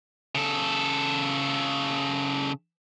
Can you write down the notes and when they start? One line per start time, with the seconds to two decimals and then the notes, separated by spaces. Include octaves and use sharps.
0.35 C#3 A4